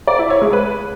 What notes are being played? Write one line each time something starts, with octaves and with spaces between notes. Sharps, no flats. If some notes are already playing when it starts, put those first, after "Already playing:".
D5
E4
C#5
G#3
B4